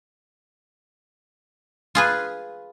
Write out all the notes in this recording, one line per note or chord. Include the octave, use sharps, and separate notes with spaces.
F4 G#4 B4